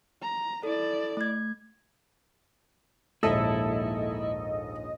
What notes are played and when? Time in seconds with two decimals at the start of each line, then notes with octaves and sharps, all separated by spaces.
0.22 A#5
0.63 E4 A4 D5
1.17 A3 G#6
3.23 A#1 D#2 G#2 E4 A4 D#5 E6